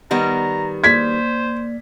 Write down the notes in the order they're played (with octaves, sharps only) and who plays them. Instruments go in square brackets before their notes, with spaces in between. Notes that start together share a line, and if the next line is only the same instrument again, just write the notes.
[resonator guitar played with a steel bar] D#3 G3 B3 [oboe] A#5
[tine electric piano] A#3 D5 [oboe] C5 [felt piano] G#6 B6